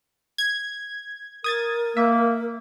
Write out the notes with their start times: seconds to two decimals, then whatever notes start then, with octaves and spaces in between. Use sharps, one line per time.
0.38 G#6
1.44 A#4 D#6 G#6 A6
1.97 A#3 E5